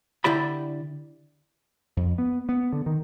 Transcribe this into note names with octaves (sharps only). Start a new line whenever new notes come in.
D3 E4 G4 D5 B5
F2
B3
B3
D3
D#3